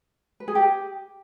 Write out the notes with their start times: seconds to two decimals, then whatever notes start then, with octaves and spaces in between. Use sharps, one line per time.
0.40 B4
0.48 G#4
0.55 G4